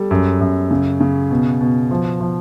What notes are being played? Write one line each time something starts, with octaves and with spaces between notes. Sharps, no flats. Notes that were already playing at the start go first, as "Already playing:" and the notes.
Already playing: G3 A4
F#2
F#2
C#3
C#3
B2
B2
F3
F3